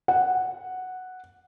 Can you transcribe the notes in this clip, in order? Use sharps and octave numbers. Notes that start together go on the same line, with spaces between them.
F#5